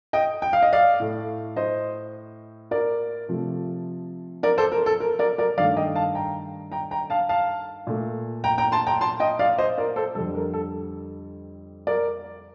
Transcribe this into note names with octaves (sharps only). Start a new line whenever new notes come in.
D#5 G5
G5
F5
D#5
D5 F5
A2 A3
C5 D#5
A#4 D5
C3 F3 A3
A#4 D5
A4 C5
A#4
A4
A#4
A#4 D5
A#4 D5
G2 D#3 A3 D5 F5
D#5 G5
F5 A5
G5 A#5
G5 A#5
G5 A#5
F5 A5
F5 A5
A#2 A3
G5 A#5
G5 A#5
A5 C6
G5 A#5
A5 C6
D#5 G5
D5 F5
C5 D#5
A#4 D5
A4 C5
F2 D3 G3 A4
A#4
A4
A#4 D5